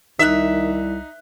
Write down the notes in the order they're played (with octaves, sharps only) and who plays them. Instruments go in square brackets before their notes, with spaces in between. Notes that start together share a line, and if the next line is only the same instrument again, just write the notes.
[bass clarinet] C2 [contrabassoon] D#3 [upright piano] D#4 F#6 [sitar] E5